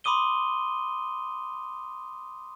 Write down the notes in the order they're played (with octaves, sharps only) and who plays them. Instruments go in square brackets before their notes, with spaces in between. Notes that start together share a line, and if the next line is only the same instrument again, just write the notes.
[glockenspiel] B5 C6 D6 D#6 D#7 G7